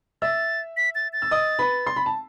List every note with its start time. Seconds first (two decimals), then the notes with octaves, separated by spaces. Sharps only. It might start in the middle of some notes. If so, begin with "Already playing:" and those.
0.22 E5 E6 A6
0.77 B6
0.95 A6
1.13 A6
1.22 E6
1.31 D#5 D#6
1.59 B4 B5
1.86 C6
1.96 B5
2.06 A5